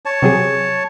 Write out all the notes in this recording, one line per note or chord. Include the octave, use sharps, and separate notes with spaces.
C#5 A5
C3 F#3 G#4